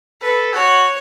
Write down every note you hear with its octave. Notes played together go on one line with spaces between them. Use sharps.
A4 B4
F#4 C#5